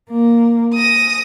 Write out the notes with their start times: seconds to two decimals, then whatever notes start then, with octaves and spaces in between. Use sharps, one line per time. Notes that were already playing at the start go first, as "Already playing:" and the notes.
0.11 A#3
0.74 D#6 A#6